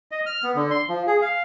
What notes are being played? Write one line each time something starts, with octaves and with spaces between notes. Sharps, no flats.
D#5
F6
B3
D3
C6
F3
G#4
F5